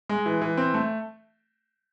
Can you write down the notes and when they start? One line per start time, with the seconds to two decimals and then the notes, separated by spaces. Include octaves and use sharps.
0.09 G#3
0.26 E3
0.41 E3
0.58 C4
0.74 A3